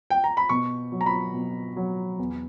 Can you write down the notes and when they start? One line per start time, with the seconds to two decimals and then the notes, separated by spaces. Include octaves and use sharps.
0.10 G5
0.24 A#5
0.37 B5
0.49 B2 C#6
0.92 F#3
1.01 A#5
1.06 B5
1.34 B2
1.76 F#3
2.19 E2